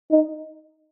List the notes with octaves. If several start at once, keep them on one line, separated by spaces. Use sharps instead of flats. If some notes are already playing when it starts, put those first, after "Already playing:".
D#4